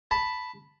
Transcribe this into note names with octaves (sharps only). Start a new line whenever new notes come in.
A5 B5